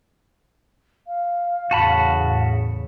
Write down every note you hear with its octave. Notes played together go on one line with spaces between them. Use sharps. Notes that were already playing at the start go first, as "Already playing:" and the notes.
F5
E2 A2 C#3 F#4 A5 B5